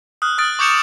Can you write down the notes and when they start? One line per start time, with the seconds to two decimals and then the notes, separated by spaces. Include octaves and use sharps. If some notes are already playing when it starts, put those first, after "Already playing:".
0.22 D#6 F6 F#6
0.38 D#6 F6 A6 D7
0.59 C#6 D6 G6 C#7 E7 F7